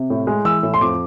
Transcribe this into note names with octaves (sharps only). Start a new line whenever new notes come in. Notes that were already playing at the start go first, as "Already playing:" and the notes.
Already playing: C3
A2
G#3
E3 E6
A2
C6
F2 D6